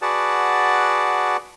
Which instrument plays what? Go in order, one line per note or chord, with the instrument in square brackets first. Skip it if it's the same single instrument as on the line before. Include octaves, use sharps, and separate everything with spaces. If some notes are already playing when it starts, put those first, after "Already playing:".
[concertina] F#4 G#4 B4 D5 F#5 A5